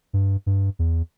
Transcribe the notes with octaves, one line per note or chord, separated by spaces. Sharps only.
G2
G2
E2